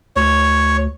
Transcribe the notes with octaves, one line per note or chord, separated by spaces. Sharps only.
D2 C#5